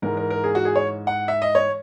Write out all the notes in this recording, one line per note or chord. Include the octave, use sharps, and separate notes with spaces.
G#2 E3 G#3 A#4
A#4
A#4
G#4
F#4
G#4
C#5
F#5
E5
D#5
C#5